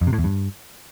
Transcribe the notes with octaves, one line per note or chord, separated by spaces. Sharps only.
F2
C3
A2
E2
G2